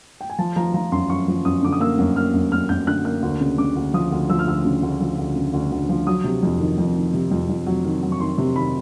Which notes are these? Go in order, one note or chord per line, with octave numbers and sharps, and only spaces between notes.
G5
G#5
F3 A5
F3 A#5
F3 A#5
F#2 C6
F#2 C#6
F3
F#2 D#6
D3 D6
D#6
A#3 E6
F#2
A#3 F6
F#2
F#2 F6
F#2 G6
D3 F#6
A#3 F#6
D2
C#3
C#3 D6
D2
F3 D#6
D2
F3 E6
F6
D2 E6
C#3
D2
F3
D2
C#3
D2
D2
F3
F#3 D#6
C3
F2
D#3
F2
D#3
C3
F2
F2
F#3
D#3
F#3
C#6
D#3 C6
C3
D#3 B5